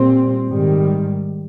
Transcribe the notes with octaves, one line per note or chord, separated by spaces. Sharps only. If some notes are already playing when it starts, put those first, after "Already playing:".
Already playing: A#2 G3 C4
G#2 D#3 G3